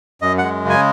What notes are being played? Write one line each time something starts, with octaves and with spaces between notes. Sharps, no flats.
F#2 D#5
G#3 F#5
C#3
G#5